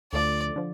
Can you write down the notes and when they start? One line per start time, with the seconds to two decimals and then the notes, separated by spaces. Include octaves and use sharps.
0.13 D2 D3 F3 A3 D5
0.56 D3 F3